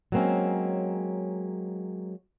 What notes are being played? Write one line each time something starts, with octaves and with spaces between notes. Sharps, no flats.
F#3 G#3 A#3 C4 C#4